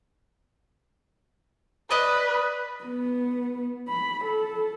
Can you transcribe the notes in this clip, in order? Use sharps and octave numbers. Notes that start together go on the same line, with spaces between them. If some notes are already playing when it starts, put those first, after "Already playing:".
B4 D5 D#5
B3
B5
A4